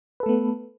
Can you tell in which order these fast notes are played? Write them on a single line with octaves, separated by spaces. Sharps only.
B4 A4 A3 B3